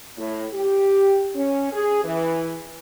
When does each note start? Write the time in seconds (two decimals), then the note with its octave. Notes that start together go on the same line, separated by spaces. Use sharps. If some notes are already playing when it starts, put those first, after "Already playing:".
0.18 A2
0.52 G4
1.36 C#4
1.72 G#4
2.04 E3